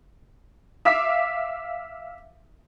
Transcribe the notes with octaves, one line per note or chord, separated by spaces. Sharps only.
E5 F5 D6 B6